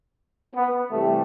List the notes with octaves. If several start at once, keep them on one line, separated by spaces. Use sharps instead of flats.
B3
C3 E3 G3 A3